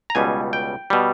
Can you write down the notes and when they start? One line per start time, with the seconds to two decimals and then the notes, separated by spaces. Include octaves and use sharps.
0.10 A#5
0.15 C#2 B2 G3 G#5
0.53 G5
0.90 B2 G3